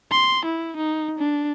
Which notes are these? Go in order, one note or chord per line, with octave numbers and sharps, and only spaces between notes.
C6
E4
D#4
D4